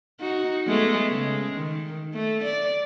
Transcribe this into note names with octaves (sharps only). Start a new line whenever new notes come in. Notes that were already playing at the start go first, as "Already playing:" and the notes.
D#4 F#4
G#3 A3 B3
C#3 G#3
D#3
A3
D5